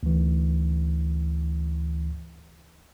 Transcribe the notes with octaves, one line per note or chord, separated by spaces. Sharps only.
D2 E3